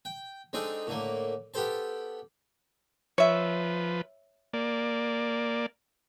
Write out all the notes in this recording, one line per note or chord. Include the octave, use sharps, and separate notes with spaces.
G5
G#3 C4 D4 D#4 G#4 A4
A2 D3 A#3
B3 G4 A4 C5 A5
F3 B4 C#5 E5
A#3 D5